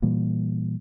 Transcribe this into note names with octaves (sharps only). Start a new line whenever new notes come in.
A#2 E3 G3 A#3